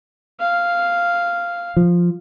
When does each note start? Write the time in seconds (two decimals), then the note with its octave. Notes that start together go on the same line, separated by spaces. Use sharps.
0.40 F5
1.77 F3